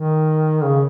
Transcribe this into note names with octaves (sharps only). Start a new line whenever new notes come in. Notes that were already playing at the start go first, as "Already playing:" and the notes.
Already playing: D#3
C#3